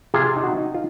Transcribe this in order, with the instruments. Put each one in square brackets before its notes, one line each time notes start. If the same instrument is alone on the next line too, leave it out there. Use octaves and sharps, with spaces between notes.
[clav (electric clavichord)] C3 F4 G#4
D#4
F#4
D#4
F4